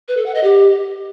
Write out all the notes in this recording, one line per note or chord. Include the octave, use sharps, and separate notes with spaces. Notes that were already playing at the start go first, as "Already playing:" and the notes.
B4
A4
F#5
D#5
G4